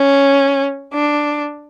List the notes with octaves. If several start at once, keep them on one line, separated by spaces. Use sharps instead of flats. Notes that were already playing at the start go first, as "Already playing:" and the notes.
Already playing: C#4
D4